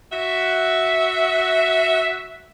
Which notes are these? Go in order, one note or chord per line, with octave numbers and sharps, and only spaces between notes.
F#4 E5